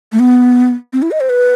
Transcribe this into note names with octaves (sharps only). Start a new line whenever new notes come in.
A3
B3
C4
E4
D#5
C5
B4